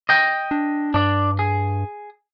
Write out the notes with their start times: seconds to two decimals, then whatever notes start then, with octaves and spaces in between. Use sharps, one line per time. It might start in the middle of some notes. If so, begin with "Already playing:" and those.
0.09 D#5 G5
0.51 D4
0.94 G2 D4 D5
1.39 G#4